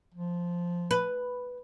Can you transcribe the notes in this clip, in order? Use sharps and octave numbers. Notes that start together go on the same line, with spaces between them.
F3
B4